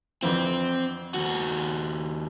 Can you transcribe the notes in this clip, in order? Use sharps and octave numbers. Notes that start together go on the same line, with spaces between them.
F2 D3 E3 C4
D#2 F#4